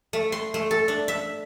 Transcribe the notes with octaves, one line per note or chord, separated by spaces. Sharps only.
A3
C6
A3
A4
D4
E5